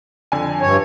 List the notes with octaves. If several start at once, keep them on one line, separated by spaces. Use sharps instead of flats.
F2 D3 G#5
G2 C#5